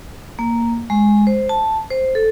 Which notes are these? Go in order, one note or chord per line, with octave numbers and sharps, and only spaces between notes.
A#3
G#3
C5
A5
C5
A4